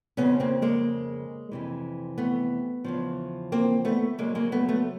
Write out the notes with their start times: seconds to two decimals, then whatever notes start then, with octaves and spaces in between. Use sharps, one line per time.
0.17 F2 C#3 F3 B3 C#4
0.40 A#3 C4
0.62 G#3 A#3
1.52 F2 C3 E3
2.18 A3 B3
2.84 E2 C#3 F3
3.52 A#3 C4
3.85 A3 B3
4.18 F2 C#3 F#3 G#3 A#3
4.35 G#3 A#3
4.52 A3 B3
4.69 A3 B3